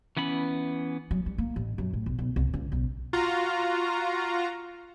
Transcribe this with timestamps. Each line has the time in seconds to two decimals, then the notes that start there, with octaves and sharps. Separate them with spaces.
0.17 E3 B3 C#4 B5
1.11 F#3
1.26 G3
1.38 A#3
1.56 A1
1.78 F#2
1.93 A2
2.06 B1
2.19 B1
2.36 C2
2.54 C#2
2.72 B1
3.13 F4 F#4 A#5